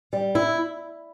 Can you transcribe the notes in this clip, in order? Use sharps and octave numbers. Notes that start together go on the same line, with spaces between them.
G3
E4